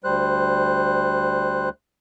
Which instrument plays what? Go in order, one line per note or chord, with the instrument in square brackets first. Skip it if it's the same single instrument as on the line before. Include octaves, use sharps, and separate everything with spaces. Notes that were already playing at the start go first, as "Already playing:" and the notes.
[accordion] D2 G3 C5 F#6